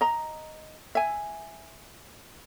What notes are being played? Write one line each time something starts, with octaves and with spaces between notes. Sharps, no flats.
D#5 A#5
E5 G#5